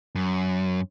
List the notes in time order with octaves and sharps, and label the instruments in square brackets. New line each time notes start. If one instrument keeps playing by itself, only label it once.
[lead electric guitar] F#2